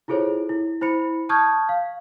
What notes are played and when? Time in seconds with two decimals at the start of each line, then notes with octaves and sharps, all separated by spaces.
0.08 E4 F4 G#4 A4 C5 C#5
0.49 E4
0.81 E4 C5 B5 C#7
1.29 A5 C#6 D#6 F6 G6 G#6
1.69 F5